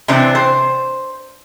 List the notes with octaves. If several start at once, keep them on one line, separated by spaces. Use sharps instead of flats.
C3 E3 C4 D4
C5